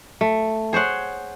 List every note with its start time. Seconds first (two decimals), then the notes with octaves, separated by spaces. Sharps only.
0.21 A3
0.73 G#4 C5 C#5 F#5